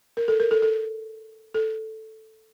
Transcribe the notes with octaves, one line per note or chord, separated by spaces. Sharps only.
A#4
A4
A#4
A4
A4
A4